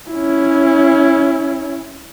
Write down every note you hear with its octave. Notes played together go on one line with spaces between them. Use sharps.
C#4 E4